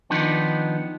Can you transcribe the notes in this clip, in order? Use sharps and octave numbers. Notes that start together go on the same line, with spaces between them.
D#3 F3 B3 D4 D#4